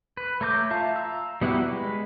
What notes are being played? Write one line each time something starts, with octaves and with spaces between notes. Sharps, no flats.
B4
A3 C#5 A#5 D6 G6
F4 E5 F5 A5
A#5 E6
G3 B3 E4 F#4 G4
G#3 B4